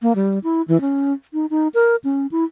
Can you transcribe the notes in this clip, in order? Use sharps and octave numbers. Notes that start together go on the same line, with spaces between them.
A#3
G3
E4
E3
C#4
D#4
D#4
A#4
C#4
E4